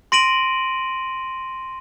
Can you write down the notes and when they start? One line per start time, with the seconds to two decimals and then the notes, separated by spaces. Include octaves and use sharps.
0.12 C6 A#6 D7 D#7 F#7